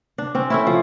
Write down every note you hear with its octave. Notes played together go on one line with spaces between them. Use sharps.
D4
C4 C#4
A3 C#4 E4
F3